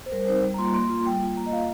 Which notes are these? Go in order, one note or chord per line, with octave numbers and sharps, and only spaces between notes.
C5
G3 A#4
C4 D#4 C5
G3
A#5
A#3 F4 C6
A#3 C6
F4
G3 G5
A#3 F4
A#3 A#5
D#5
F4 F5